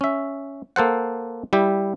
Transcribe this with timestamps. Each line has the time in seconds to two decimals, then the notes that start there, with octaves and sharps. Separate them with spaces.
0.01 C#4 E5
0.76 A#3 A4 C5 F#5
1.53 G3 E4 G4